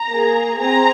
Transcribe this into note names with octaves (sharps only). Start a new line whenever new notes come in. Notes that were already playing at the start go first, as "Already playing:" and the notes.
Already playing: A#5
A#3 G#4
C4 G#4 A#5